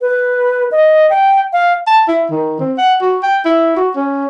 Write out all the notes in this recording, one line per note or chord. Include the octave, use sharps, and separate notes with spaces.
B4
D#5
G5
F5
A5
E4
D#3
C4
F#5
F#4
G5
E4
F#4
C#4